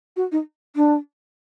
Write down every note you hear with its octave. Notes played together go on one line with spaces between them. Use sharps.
F#4
D#4
D4